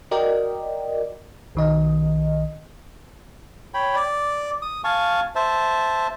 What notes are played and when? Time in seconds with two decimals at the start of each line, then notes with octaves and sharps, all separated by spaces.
0.11 F#4 A#4 D5 D#5 G5
1.55 B1 D#3 D#5
3.74 C#5 G5 B5
3.95 D5
4.62 D#6
4.84 F5 G#5 A5 C#6
5.35 C5 E5 A5